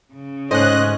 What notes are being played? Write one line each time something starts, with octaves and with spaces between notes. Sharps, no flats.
C#3
D2 G#2 C#4 C5 D#5 F#6